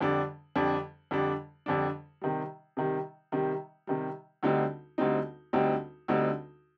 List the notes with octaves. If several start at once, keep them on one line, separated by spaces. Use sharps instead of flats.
F2 D3 G3 D4
F2 D3 G3 D4
F2 D3 G3 D4
F2 D3 G3 D4
C3 D#3 G3
C3 D#3 G3
C3 D#3 G3
C3 D#3 G3
D2 D3 G3 C4 D#4
D2 D3 G3 C4 D#4
D2 D3 G3 C4 D#4
D2 D3 G3 C4 D#4